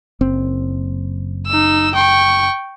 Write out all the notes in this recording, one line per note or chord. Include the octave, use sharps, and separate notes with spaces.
F#1 C4
D#4 E6
G5 C#6